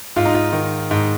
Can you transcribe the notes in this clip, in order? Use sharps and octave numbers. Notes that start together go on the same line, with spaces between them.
G#2 F4
D#4
F4
D#3
G#2